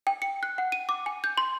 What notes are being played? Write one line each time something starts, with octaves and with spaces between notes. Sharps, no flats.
G5
C#7
F#6
F#5
D#7
D6
G#5
G6
C6